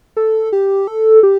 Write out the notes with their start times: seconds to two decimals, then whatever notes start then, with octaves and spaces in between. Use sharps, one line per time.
0.17 A4
0.53 G4
0.87 A4
1.23 G4